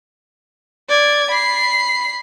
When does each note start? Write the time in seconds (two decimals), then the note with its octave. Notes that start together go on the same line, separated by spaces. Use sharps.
0.89 D5 G#6
1.30 B5 C7